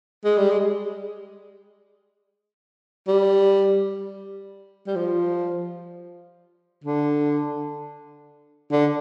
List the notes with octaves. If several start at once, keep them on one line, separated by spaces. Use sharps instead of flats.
G#3
G3
G#3
G3
G3
F3
D3
D3